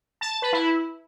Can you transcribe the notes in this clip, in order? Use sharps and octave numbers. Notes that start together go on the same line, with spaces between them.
A5
A5
B4
E4